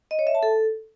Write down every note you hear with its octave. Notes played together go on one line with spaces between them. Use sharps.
D#5
C#5
E5
A5
A4